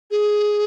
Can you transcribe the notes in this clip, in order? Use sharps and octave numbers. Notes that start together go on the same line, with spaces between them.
G#4